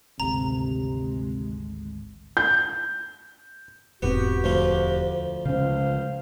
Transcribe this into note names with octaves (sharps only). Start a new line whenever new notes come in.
G#1 D2 C3 G#3 A#5
G6
E1 G#2 B3 C4 F#4 G4
D2 F3 F4
C#2 C#3 C#4 C5 F5